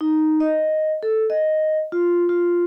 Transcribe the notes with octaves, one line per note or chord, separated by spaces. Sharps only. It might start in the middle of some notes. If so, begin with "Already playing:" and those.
D#4
D#5
A4
D#5
F4
F4